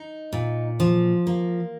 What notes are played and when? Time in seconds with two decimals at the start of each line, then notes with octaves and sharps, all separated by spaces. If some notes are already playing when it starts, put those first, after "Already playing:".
Already playing: D#4
0.33 A#2
0.80 F3
1.27 A#3